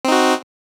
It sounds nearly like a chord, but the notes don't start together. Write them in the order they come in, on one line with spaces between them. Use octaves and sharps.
C4 D#4 F#4